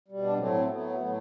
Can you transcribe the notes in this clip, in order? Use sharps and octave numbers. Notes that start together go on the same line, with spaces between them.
B2 G3
D4
A2 F#3 A3 C4
C4
A2 F#3 A3 B3
A2 F#3 A3